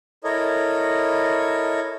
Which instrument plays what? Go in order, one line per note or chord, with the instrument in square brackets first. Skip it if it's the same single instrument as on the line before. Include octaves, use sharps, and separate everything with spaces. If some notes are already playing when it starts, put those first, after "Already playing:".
[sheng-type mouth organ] E4 A4 A#4 C#5 D#5